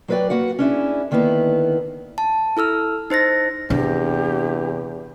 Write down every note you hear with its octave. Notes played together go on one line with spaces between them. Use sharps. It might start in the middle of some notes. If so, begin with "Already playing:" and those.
F#3 F#4 B4 C5 D5 G5
A#3 F#4 B4 F#5
C#4 D4 E4 G#4
D3 D#3 A#3 B3 E4 B4
A5
E4 A4 E6 F6
D#4 C5 A6 A#6
E2 C3 D4 G4